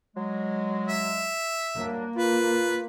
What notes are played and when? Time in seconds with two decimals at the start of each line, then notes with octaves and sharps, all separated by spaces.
0.16 F#3 G#3
0.88 E5
1.79 F#3 G3 A#3 D4
2.16 F4 B4